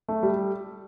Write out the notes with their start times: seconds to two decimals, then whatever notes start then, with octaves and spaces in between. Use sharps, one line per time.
0.08 A3
0.23 G3